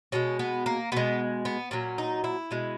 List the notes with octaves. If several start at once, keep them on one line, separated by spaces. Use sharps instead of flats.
B2 G#3 C#4
B3
A#3
B2 G#3 B3
B3
A#2 F#3 C#4
D#4
E4
B2 G#3